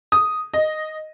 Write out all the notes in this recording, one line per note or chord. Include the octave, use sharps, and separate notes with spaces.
D#6
D#5